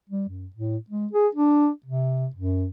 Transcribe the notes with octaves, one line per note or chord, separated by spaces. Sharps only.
G3
F#2
A2
G#3
G#4
D4
C3
F#2